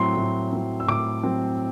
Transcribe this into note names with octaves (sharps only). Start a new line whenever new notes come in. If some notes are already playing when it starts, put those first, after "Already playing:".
Already playing: A2 F#3 C4 C6
A2
F#3 C4
E6
A2 D6
F#3 C4